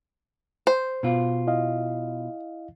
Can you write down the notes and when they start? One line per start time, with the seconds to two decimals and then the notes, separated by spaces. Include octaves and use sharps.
0.67 C5
1.03 B2 F4
1.47 E4 D#5 F5